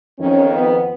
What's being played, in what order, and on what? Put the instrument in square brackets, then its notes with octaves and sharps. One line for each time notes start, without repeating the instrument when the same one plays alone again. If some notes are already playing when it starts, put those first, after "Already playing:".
[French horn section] F2 D#3 C#4
B3